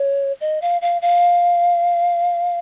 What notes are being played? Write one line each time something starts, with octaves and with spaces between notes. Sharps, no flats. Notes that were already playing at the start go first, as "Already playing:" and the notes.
Already playing: C#5
D#5
F5
F5
F5